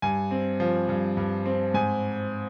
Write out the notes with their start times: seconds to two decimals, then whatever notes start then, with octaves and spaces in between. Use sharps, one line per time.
0.02 G2 G#5
0.31 C4
0.60 F3
0.89 G2
1.17 G2
1.46 C4
1.74 G#2 G#5